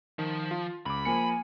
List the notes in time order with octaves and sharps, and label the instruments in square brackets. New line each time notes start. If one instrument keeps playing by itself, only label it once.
[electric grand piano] D#3 [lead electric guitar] F3
[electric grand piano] F4
[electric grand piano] C#2 D6 [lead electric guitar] B5
[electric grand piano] F3 A#3 C#7 [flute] G#5